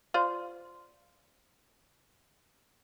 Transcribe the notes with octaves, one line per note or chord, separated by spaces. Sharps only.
F4 C5 D5